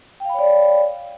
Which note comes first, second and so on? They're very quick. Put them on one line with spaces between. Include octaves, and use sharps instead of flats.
G5 F5 B5 C#5 D5